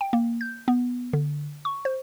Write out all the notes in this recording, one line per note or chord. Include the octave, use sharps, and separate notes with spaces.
G5
A#3
G6
B3
D3
C#6
C5